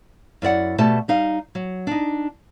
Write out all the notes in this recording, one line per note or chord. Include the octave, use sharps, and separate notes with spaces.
F#2 E4 D5 F#5
B2 A3 G4 A5
G3 D#4 F5
F#3
D4 D#4